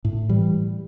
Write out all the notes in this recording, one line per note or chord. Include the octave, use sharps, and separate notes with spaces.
A2
E3 G3